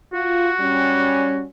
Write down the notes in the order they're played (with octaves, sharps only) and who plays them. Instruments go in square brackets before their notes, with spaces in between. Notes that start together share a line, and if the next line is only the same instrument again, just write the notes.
[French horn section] F4 [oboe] F#4
[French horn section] G3 C#4